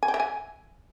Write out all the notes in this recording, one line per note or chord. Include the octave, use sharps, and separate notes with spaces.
G#5
G5
E5
G#5